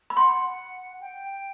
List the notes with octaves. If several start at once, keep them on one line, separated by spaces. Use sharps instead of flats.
B5
F#5 C6
G5